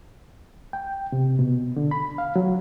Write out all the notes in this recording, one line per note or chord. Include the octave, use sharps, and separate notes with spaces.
G5
C3
B2
D3
B5
F5
F#3